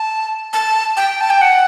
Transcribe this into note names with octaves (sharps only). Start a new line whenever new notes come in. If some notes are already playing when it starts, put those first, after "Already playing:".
Already playing: A5
A5
G5
A5
G5
F#5